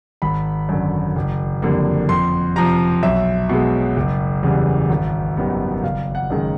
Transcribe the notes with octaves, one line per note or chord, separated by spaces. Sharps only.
G#1 B5
F#2 D3
F#1
F2 D3 G3 A#3
F2 C6
C3 F3 A#5
B1 E5
B2 G#3
F#1
E2 C#3 E3 G3
G#1
F#2 D#3 G3 B3
F#1 F5
F#5
F#2 D#3 G#3